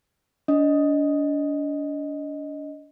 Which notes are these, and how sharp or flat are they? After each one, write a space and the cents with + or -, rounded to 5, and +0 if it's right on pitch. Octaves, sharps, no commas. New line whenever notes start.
D4 -35 D#5 +0